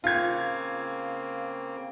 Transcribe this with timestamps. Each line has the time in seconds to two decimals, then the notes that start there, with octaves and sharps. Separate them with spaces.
0.04 C#3 A#3 C4 F4 G#6